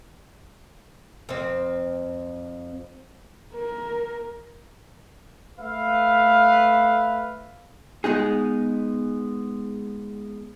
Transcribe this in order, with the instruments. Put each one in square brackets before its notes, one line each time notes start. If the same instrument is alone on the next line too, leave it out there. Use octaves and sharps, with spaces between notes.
[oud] F2 C4
[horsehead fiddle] A#4
[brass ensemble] A3 B4 E5 F5
[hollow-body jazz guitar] G#3 B3 D#4 G#4